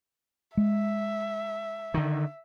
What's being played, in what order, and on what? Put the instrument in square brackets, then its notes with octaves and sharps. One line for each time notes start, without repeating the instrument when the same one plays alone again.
[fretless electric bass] G#3 [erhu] E5
[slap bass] D3 D#3